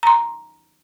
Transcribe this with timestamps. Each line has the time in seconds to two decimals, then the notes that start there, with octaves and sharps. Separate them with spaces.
0.03 A#5 C6